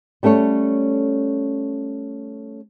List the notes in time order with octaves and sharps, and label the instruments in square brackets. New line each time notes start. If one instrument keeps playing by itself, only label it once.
[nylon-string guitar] G3 A3 C#4 A4 C#5